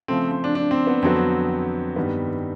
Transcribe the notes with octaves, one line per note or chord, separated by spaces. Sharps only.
C#3 F3 A3 C4
C4
D4
D4
C4
B3
F2 D3 F#3 B3 C4
G2 D#3 G3 B3